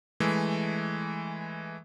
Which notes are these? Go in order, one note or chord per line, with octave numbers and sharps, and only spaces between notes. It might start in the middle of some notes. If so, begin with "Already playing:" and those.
E3 G#3 A3